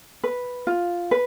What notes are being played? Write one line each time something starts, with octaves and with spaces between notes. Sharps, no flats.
B4
F4
B4